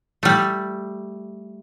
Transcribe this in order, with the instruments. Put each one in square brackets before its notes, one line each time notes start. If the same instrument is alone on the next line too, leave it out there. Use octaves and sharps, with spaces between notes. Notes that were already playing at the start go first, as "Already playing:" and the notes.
[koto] G3 A3